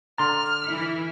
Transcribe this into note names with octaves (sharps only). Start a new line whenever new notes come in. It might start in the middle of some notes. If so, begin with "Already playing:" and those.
D3 A#5 C6 D6 F6 A6
E3 E4